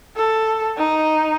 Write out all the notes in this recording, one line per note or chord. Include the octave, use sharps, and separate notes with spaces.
A4
D#4